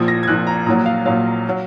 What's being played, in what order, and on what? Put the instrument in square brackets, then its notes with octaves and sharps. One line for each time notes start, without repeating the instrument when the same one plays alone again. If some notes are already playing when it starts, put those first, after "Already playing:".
Already playing: [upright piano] A#1 A#2 F3 G#6
A#6
G#6
A#1 A#2 F3 F#6
A#5
A#1 A#2 F#3 A#5
F5
A#1 A#2 F#3 F5
F#3